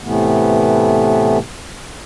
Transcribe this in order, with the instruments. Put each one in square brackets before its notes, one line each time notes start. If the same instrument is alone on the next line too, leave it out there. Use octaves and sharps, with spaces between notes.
[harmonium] A2 C3 E3 A3 B3